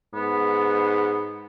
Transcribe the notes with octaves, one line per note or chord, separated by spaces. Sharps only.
G#2 B3